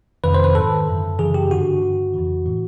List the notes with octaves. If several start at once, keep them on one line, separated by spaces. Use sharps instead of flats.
F2 C3 D#3 B4
C5
B4
G#2 D#3 A4
F#2 D3
F#2 C#3 E3 G#4
G4
G2 D3 F#4
G2 D3
F2 C#3 E3
A2 E3